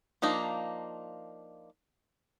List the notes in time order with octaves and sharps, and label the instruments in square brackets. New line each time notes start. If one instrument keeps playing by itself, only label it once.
[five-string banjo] F3 A#3 D4 D#4